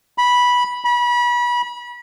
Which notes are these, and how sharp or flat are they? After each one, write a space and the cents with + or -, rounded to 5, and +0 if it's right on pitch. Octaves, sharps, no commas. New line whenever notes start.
B5 -10
B5 -30